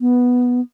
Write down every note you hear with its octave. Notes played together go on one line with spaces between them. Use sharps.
B3